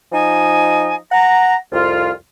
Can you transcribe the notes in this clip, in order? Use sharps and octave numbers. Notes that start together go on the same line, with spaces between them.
F3 D#4 D#5 G#5
F#5 A#5
C2 F2 F4